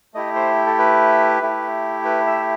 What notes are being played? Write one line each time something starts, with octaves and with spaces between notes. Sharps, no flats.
A3 E4 G4 D#5
C5
A4
B4
A3 E4 G4
B4
E5